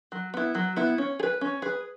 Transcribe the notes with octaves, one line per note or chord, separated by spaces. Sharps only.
F#3
B3 E4
F#3
B3 E4
C#4
G#4
B4
C#4
G#4 B4